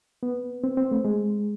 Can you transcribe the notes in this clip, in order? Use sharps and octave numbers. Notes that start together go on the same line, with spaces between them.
B3
C4
C4
A3
G#3